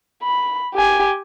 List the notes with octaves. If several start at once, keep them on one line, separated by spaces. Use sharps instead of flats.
B5
G4 G#5